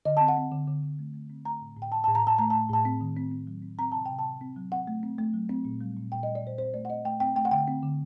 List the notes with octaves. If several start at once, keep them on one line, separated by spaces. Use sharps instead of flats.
D3 D#5
A5
C4
F#5
C4
D3
D3
D3
A3
A3
C4
A3 A#5
A2
A2
G5
A2 A5
A5
A2
A#5
A2 A5
A3 A#5
A5
A2
A2 A5
C4
D#3
C4
C4
F#3
C4
C4 A#5
C3 A5
C3 G5
A5
C3
C4
F#3
C4 F#5
A3
C4
A3
F#3
C4
A#2
G3
A#2
A#2 G5
D#5
G3
D5
A#2 C5
C4 C5
A3 D5
F#5
C4 D#5
A3 G5
C4 G5
A3 G5
F#5
D3 G5
C4
D3